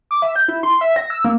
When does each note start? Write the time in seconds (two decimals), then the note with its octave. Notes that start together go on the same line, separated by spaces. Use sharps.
0.11 D6
0.22 E5
0.36 G6
0.48 E4
0.63 C6
0.81 E5
0.96 A#6
1.10 E6
1.25 A#3